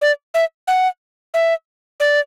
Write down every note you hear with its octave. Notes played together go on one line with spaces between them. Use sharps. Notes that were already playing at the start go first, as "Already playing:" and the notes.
D5
E5
F#5
E5
D5